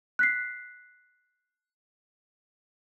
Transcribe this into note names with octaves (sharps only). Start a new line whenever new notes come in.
F#6 B6 C7